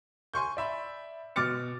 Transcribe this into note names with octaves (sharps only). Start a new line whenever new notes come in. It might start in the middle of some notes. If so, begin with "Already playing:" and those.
G#5 C6 C#6 G6
D5 E5 B5
B2 D6 F6 A6 C#7